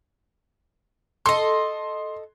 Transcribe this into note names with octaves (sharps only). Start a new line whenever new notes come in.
A4 D#5 C6